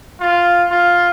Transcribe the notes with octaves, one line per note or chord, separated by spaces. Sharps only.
F4
F4